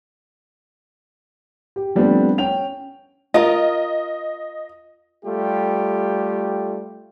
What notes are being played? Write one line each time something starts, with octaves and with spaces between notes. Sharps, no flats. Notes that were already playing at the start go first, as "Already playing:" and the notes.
G4
F3 G3 A3 B3 C4 D4
C#4 G5 F7
F4 A#4 D#5
G3 A3 F4 G4